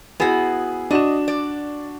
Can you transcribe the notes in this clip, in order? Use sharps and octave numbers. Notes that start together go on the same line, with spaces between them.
B3 E4 F#4 G#4
D4 F#4 D#5 E7
D5